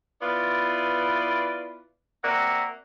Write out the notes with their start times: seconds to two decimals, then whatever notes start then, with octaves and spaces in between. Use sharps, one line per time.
0.22 B3 E4 F4 B4 D5
2.23 A#3 C4 F#4 D5 E5